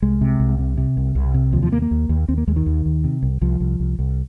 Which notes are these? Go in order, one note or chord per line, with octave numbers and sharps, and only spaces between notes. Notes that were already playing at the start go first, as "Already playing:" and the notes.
C2 G#3
C3
C2
C3
C3
C2
C2
C3
D#2 F3
F3
D#2 A#3
A#3
D#2
D#2
D#2 C4
A#3
D#2 G#3
D#3
D#2
D#2
C3
C2
C2 F3
C2
C2
C2